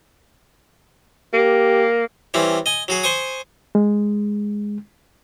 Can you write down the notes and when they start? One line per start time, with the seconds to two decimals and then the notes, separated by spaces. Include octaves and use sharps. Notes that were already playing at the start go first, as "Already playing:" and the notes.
1.34 A#3 G4
2.34 E3 G3 C4 C#4
2.66 D#5 G#5
2.88 F#3 F#4 G#4
3.03 C5 G#5 C#6 D#6
3.75 G#3